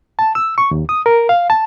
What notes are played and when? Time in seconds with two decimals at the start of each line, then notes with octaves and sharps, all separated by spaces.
0.19 A5
0.35 E6
0.58 C#6
0.71 D#2
0.89 D#6
1.06 A#4
1.29 F5
1.50 A5